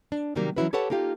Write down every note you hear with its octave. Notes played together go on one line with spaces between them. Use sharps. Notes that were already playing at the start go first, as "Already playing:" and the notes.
D4
C3 D#3 F#3 G3 A#3
E3 F#3 C#4 E4 F#4 B4
G4 A4 B4 C#5 F#5 A5
A#3 D#4 F4 G4 F5